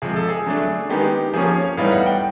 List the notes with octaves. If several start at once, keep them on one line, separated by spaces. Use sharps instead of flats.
C3 F3 G#3 G#4
A4
G#4
D3 F#3 A3 D4
D#3 G#3 B3 D#4 G4
F3 A#3 C#4 G#4
C#5
A2 E3 G3 B3 D#4 F5
F#5
G5